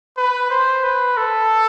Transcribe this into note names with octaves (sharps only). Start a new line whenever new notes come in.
B4
C5
B4
A4